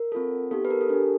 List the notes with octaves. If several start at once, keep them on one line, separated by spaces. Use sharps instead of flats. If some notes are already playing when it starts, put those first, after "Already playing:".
Already playing: A#4
C4 F4 A4
B3 D#4 G4 A4
B4
A#4
A4
D4 G4 A#4